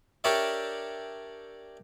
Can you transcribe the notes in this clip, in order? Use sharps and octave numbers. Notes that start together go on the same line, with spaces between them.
D4 G4 A#4 C#5 D5 E5